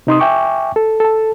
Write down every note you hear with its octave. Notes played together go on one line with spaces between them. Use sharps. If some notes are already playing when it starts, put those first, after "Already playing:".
C3 D#4 C6 D#6
E5 G5 G#5 C#6 D6
A4
A4 A5